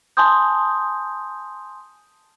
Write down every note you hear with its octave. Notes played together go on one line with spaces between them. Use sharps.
G#5 A5 C6 D#6 G6